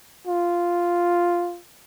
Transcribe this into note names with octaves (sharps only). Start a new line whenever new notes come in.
F4